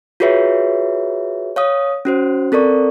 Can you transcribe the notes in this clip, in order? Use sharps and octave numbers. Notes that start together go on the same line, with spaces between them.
F4 F#4 G#4 B4 C#5 E5
C#5 F5 D#6
C#4 F#4 C5
C4 A4 A#4 D5 C#6